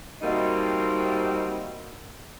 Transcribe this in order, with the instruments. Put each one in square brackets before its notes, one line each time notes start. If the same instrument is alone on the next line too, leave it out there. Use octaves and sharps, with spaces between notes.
[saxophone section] G3 A3 A#3 C4 D#4 F#4